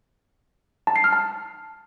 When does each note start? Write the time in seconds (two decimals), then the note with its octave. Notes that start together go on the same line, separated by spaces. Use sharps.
0.87 A5
0.96 C7
1.04 F6
1.12 A5